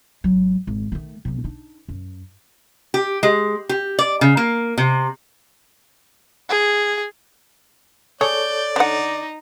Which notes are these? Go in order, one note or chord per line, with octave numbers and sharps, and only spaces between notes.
G#1 F#3
G#1
D#3 A3
B1 C3
D4 D#4
F#2
G4
G#3
G4
D5
C#3
A#3
C3
G#4
G#4 A4 C#5 D5 G6
D3 D#4 F#5